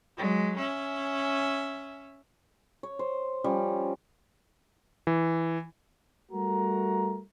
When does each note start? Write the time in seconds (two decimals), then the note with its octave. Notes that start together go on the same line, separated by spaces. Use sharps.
0.18 F#3 G#3
0.58 C#4 E5
2.83 C#5
2.99 C5
3.44 F3 G3 C#4
5.07 E3
6.31 G3 A3 F#4 A#4 A#5